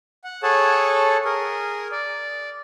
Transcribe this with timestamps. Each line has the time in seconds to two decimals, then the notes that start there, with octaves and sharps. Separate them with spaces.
0.24 F#5
0.43 G#4 A4 C#5 F#5 A5
1.25 G#4 A#4
1.92 D5